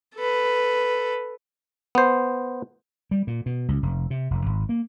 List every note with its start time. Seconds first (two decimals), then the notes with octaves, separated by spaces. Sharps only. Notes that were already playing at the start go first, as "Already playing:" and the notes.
0.16 A4 B4
1.95 B3 C5
3.11 G3
3.27 A#2
3.46 B2
3.68 C#2
3.83 F1
4.10 C3
4.31 F1
4.46 G#1
4.69 A#3